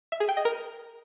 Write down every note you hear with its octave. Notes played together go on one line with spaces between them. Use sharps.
E5
G#4
G5
D#5
A#4